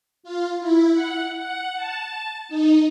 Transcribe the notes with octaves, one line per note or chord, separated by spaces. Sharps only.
F4
E4
F#5
F#5
A5
D#4